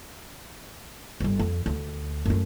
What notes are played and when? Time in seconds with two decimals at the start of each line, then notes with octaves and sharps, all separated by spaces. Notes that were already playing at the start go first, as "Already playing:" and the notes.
1.20 G1 G2
1.39 F2
1.66 D2
2.25 F#2 A3